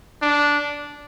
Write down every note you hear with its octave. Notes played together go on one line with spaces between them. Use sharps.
D4